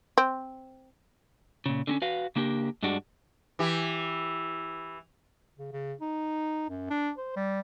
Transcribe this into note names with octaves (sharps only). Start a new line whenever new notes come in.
C4
A#2 C#3
D3 C4 C#4
F#4 B4 F5
C#3 A#3 D4 G4 A#4
G2 G3 G#3 D4 F#4
E3 G4
C#3
C#3
D#4
F#2
D4
C5
G3